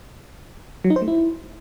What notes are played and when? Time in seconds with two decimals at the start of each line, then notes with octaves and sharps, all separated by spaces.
0.84 F#3
0.90 D#4
0.96 C5
1.02 A3
1.08 E4